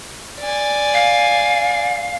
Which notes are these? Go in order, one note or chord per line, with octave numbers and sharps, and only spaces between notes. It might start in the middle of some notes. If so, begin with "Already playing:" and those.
D5 G#5
F5